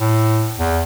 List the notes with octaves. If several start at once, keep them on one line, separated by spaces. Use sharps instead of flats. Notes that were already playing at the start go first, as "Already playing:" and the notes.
A2
E2